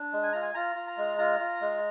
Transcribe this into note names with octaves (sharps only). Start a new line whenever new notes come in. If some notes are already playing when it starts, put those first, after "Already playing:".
Already playing: D4
G#3
G#5
F4 A#5
G#5
F4 A#5
F4
A#5
G#3
F4 A#5
F4
G#3